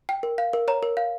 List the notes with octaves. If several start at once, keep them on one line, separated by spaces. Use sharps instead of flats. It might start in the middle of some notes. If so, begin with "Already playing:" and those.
G5
A#4
F5
A#4
C#5 A#5
A#4
F5